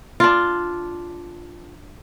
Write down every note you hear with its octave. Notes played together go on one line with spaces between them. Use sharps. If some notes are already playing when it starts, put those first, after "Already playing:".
D4 F4